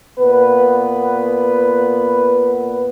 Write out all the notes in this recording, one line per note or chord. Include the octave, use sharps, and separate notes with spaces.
A#2 B3 B4